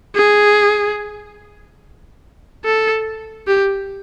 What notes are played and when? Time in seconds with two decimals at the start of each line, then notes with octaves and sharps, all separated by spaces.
0.15 G#4
2.65 A4
3.47 G4